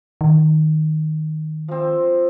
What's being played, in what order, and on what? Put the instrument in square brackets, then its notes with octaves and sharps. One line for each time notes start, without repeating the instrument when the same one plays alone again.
[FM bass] D#3
[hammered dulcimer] F3 C4